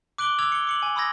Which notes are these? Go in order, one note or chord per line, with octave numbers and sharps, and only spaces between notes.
D6 F#6 D7 F#7 G7
D6 E6 F#6 G#6 F7
C#7 G7
D6 C#7 F#7
G#5
B5 C6 D#6 E6 G#6 A#6